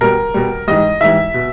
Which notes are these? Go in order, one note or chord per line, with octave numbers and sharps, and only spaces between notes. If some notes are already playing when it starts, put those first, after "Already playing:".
B2 G3 A#4
B2 G3
G#2 E3 G3 D#5
G#2 E3 G3 E5
B2